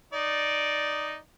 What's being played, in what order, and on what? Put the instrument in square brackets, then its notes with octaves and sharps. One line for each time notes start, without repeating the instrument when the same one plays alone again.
[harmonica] D#4 D5